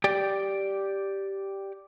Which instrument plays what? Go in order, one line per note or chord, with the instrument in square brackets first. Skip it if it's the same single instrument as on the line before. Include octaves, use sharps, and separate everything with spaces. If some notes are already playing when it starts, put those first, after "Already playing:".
[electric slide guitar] G4 D5 G5